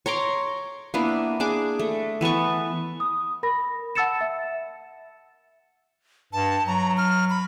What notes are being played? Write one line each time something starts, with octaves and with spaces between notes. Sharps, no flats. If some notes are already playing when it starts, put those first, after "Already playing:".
C#5 A#5 C6 D6
A#3 B3 D4 E4
D4 G#4 D6
A3
E3 B3 A5 C#6
D#6
A#4 B5 A#6
F#5 A5 E6 A6 C#7 E7
E5
G2 A5
F#3 A#5
F6
B5